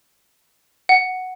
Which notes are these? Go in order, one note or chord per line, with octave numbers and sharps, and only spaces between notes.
F#5